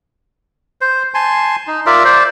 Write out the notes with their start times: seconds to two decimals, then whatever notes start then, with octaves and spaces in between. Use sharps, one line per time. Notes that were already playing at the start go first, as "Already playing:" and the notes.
0.81 C5
1.14 G#5 A5 C6
1.67 D#4
1.86 F4 A#4 D5 E5
2.05 C5 D5